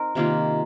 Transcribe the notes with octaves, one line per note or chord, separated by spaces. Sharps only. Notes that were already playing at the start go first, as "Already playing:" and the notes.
Already playing: C4 D#4 A#4
C3 D#3 A#3 F4